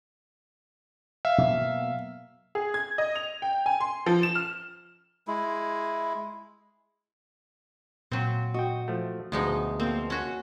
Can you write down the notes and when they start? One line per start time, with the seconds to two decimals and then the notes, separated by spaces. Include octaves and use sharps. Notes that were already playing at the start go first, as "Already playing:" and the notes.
1.25 E5 F5
1.38 B2 F#3 A#3
2.55 G#4
2.74 G#6
2.98 D#5
3.15 F7
3.42 G5
3.66 G#5
3.80 C6
4.06 F3
4.23 E7
4.35 F6
5.27 G#3 E4
8.12 A#2 F#3 C4
8.54 F#4 D#5 G5
8.88 F3 A3
9.32 D2 B2 F3 G#3 D#4
9.80 F3 A#3 C4
10.10 C#4 F#4